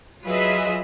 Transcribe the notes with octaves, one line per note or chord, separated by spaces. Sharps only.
F#3 F4 G#4 B4 D#5 E5